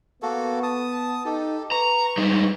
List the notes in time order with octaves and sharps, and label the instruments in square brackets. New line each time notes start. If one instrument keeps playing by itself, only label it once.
[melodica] A#3 F#4 A4 [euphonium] B3
[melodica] A5 D#6
[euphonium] D#4 [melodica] G4 A4
[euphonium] B4 [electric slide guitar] A#5 [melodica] C#6
[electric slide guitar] G3 G#3 D#4